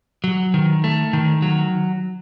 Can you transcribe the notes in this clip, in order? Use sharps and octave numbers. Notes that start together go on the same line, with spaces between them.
F#3
D#3
A3
D#3
F#3